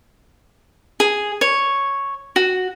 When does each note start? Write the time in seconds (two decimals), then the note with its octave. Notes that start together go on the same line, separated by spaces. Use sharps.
1.00 G#4
1.41 C#5
2.36 F#4